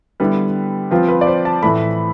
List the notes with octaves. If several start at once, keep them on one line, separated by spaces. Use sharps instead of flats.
D3 G3 B3 E4 B4
F3 C4 F4 B4
B4
D5
C5
A5
A2 E3 A3 B5